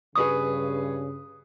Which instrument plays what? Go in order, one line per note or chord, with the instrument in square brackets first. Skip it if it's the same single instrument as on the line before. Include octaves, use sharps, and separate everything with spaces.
[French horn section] G2 C#3 [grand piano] G#4 B4 C#6 [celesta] D#6